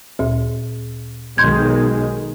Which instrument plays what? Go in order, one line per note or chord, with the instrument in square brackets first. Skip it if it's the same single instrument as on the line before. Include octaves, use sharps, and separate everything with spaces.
[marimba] D2 A#2
[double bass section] B1 D#3 G#3 [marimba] C6 G6 G#6